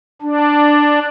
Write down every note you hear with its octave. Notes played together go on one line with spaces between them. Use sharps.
D4